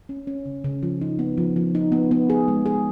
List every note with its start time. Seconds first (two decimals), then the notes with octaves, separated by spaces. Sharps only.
0.09 C#4
0.27 C#4
0.46 C#3
0.64 C#3
0.83 F3
1.01 D#4
1.19 B3
1.38 F3
1.56 F3
1.75 D#4
1.92 B3
2.11 B3
2.30 G#4
2.48 G#3
2.66 G#4